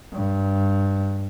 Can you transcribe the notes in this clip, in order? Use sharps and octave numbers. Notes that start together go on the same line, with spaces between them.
G2